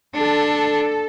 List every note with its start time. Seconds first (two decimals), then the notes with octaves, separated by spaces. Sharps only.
0.14 D4 A4